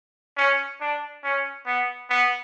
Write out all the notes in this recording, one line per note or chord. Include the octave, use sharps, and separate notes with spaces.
C#4
D4
C#4
B3
B3